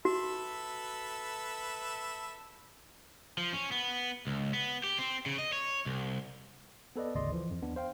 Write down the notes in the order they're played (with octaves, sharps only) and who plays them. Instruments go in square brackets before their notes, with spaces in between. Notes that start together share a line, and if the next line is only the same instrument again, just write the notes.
[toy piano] F#4 [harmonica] A4 B4 E5
[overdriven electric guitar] F3
C#4
B3
C#2
B3
G4
C4
C#3
D#5
C#5
C2
[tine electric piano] B3 A4 B4 D5 D#5
G#1 D2 C#3 D5 D#5 C6
E3 F3
F2
D#2 B3 D4
C5 F5 G5